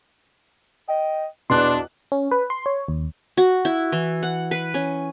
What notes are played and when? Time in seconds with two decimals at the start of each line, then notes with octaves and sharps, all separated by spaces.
0.88 D#5 G5
1.50 E2 B2 D4 C6 F#6
2.12 C#4
2.32 B4
2.50 C6
2.66 C#5
2.88 D#2
3.37 F#4
3.65 E4
3.92 E3
4.23 F#5
4.51 B4
4.74 C#4